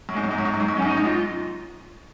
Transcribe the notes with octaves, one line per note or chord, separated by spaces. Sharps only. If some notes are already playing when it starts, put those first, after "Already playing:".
F#2
G#2 G#3
F#2 F#3
G#2
F#2
G#2
F#2
G#2
F#2
G#2
C#4
F#2
D#4
G#2
F#2
G#2 F4